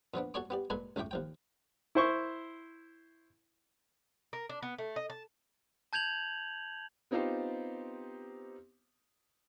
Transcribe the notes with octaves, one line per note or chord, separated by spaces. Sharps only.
A#2 F3 B3 D4
F#4 A4 C#5 D5 G#5 D6
B3 G4 D5
A#2 G#3 A4 B4 G#5
C#2 A2 A3 G5 D6
D#2 F3 G5
E4 C5 C#6
A#4
D4
B3
A3
D#5
A5
A5 G6 G#6 F7 F#7
B3 C4 D#4 F4 G4 C5